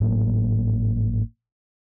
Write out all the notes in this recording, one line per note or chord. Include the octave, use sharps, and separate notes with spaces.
G#1 A2 F#3 A#3